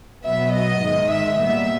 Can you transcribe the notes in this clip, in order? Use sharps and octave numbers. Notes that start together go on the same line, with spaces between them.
B2 F#3 B3 E5
D#5
G#2 D#3 G#3
E5
A#2 G3 B3 E5